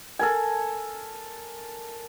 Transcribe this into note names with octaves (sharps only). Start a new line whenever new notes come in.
A4 A#4 G#5